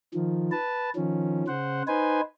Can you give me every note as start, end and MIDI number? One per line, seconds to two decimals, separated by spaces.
0.14 0.51 51
0.14 0.51 53
0.52 0.90 71
0.52 0.90 81
0.96 1.44 51
0.96 1.44 53
0.96 1.44 61
1.48 1.83 49
1.48 1.83 72
1.48 1.83 78
1.88 2.21 63
1.88 2.21 71
1.88 2.21 72
1.88 2.21 80